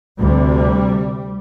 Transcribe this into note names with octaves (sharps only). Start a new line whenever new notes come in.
D2 C3 G3